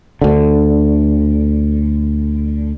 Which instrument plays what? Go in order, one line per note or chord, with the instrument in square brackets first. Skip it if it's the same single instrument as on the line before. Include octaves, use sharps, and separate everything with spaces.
[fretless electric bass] D2 D3